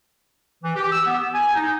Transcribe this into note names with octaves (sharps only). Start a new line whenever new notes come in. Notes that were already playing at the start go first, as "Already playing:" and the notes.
E3
G4
E6
B3
G#5
D#4